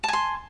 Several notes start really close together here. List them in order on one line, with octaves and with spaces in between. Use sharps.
A5 G#5 C6